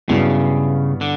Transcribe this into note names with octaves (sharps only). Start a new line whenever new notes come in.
G2 C#3 F#3 B3 E4
D3